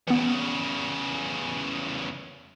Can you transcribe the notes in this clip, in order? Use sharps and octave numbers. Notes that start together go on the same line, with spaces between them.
E2 C#3 E3 B3